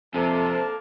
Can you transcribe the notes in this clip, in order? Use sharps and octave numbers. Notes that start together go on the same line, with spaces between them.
F2 C3 A#3 D4 A4 A5